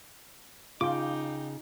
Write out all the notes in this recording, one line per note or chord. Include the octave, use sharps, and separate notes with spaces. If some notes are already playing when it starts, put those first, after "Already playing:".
C#3 D#4 F4 G5 D6